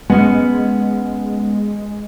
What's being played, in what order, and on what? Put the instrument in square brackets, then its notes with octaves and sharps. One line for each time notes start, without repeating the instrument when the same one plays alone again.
[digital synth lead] G#3 [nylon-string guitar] B3 C#4